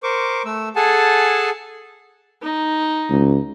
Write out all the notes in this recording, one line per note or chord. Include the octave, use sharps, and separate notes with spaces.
A#4 C5 C#6 D6
A3 E6
G#4 A4 F#5 G#5 A5
D#4
C#2